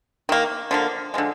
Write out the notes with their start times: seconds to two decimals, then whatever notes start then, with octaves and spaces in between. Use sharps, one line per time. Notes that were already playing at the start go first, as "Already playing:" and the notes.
0.29 D#3 A#3
0.71 D3 F3 A#3
1.14 D3 F3 G#3